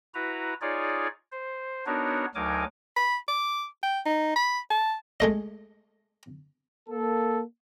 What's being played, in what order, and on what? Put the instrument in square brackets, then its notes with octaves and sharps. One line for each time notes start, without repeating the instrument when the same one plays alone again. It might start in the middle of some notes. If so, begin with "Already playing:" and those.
[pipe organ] E4 F#4 B4 A#5
D#4 F4 G#4 C#5 D5
C5
B3 D4 D#4 F#4 A#4 C#5
D2 F#3 D#4 A#4 G#5 D6
[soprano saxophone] B5
D6
G5
D#4
B5
A5
[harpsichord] G#3 A3 D#5
[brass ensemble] A#3 A4